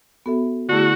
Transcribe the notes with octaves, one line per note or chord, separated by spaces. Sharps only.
B3 F#4 A4 E5
D3 A3 E4 F#4 G#4